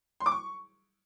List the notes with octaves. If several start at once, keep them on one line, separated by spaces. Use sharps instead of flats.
C6
D6
C#6